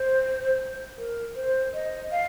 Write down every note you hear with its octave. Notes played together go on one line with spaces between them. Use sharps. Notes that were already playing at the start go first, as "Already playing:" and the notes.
Already playing: C5
A#4
C5
D#5
F5